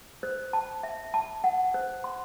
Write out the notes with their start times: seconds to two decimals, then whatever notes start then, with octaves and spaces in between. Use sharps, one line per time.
0.23 C5
0.53 A5
0.83 E5
1.14 A5
1.44 F#5
1.74 C5
2.04 C6